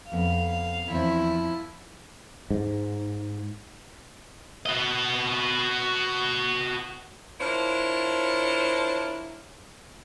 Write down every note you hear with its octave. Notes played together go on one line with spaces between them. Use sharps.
F2 B3 F5
E2 F3 C4 E4
G#2
F#4 D#5
D4 E4 F4 A#4 C5 C#5